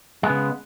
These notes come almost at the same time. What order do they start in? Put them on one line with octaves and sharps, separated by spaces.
G#3 B3 C#3